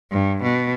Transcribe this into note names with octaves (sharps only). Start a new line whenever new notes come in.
G2
B2